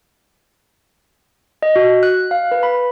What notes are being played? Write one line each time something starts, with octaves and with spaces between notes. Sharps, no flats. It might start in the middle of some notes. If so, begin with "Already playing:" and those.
D#5
F#4
F#6
F5
B4
B5